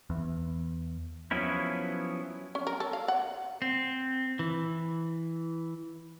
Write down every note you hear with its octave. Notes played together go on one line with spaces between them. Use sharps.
E2
F3 F#3 B3 C#4 E4
C#4
A#4
A4
F5
F#5
C4
E3